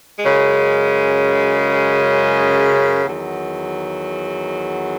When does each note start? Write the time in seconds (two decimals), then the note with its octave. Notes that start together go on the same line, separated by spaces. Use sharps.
0.19 F#2 C#3 G#3
3.03 E2 D#3 F#3